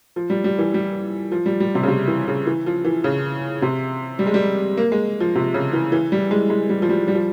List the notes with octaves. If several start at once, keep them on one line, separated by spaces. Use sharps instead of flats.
F3
G3
G3
E3
G3
F3
G3
G3
C3
C#3
C3
E3
C#3
E3
F3
E3
C#3
C3
G3
G#3
G3
A#3
G#3
F3
C3
C#3
E3
E3
G3
G#3
G#3
G3
F3
G3
G3
F3